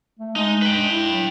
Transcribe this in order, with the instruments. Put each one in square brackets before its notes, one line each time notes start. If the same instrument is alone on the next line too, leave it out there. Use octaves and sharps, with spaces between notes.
[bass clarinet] A3
[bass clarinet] G#3 [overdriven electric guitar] D#4
[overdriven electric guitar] B4 G5
[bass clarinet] D4
E4
F#3